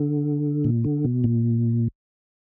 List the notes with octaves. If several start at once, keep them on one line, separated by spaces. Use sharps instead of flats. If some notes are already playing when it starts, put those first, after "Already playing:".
Already playing: D3
A#2
D3
B2
A#2